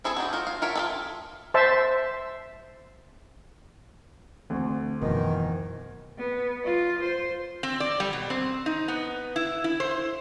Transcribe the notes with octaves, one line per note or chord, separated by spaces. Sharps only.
C4 E4 G#4 A4
D4 D#4 F#4
F4 F#4
F5
F4 A4 A#4 C#5 E5
F4 G#4 A4
C5 E5 A5
D2 A3 C4
F#2 B2 D#3 E3
B3
F4
C5
C4
D5
G3
B2
C4
D#4
B3
E4
E4
C5